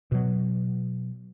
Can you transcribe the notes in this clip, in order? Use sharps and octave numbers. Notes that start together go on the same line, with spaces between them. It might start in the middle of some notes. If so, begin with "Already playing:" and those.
B2 F#3